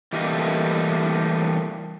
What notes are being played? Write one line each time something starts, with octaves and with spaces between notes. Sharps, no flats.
E3 G3 A3 A#3 D#5